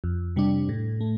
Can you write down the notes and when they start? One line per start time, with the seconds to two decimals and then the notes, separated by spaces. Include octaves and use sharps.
0.04 F2
0.36 C3 G3 D4
0.69 A2
1.01 A3